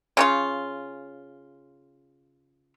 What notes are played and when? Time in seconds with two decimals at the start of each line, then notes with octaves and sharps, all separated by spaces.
0.17 C#3 C#4 F4